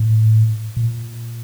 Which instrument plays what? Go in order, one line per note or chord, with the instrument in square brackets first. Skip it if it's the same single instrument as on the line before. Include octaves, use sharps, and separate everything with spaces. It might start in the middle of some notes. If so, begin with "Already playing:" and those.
Already playing: [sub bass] A2
A#2